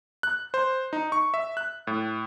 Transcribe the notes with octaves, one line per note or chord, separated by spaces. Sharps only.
F#6
C5
D#4
C#6
E5
F#6
A2